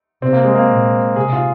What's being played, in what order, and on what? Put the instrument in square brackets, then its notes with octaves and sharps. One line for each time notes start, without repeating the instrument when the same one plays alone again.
[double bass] C3 [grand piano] C4
[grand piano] A#3
G#3
A#3
[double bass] A#2
[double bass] C3 [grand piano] G#4
[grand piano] F4